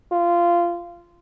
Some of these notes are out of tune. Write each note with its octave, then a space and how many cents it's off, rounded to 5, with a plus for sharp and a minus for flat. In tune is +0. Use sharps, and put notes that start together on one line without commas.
F4 -15